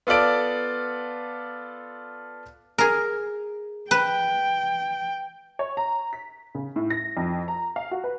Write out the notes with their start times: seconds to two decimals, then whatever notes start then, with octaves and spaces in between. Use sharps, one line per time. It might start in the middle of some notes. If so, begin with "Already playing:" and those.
0.07 B3 F4 A4 D5 D7
2.78 G#4 A#4
3.91 B4 G5
5.59 C#5
5.77 A#5
6.13 B6
6.55 C#3
6.76 A2
6.90 A#6
7.17 F2
7.48 A#5
7.76 F5
7.91 F#4
8.04 B4